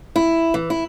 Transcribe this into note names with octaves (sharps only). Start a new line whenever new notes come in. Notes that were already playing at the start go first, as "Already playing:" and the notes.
E4
E3
E4